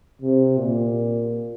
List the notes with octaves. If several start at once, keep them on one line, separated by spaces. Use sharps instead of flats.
C3
A#2